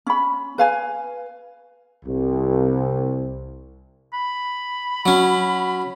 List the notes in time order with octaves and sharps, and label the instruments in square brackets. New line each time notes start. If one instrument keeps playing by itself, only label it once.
[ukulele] C#4 B5
B4 F5 G#5
[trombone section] C2
[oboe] B5
[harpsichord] F#3 C#4